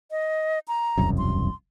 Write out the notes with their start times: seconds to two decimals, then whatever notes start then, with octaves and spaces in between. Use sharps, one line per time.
0.11 D#5
0.68 A#5
0.98 E1 C2 F#2
1.18 C6